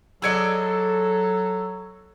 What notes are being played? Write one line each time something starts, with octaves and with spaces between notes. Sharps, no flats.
F#3 G#4 A4 D5 D#5 E6 G#6 C#7